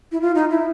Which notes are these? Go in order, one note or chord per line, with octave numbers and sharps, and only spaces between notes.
E4
F4
D#4
E4